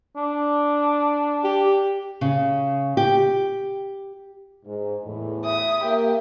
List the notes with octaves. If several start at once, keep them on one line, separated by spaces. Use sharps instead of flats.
D4
G4
C#3
G4
G#2
E2 A2
E5 D#6
A#3 G4